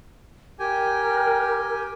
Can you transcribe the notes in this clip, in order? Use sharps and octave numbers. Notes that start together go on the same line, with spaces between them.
G4 A#4 G5 G#5